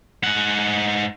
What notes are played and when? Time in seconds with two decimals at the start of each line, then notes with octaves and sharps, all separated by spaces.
0.23 G#2 F#5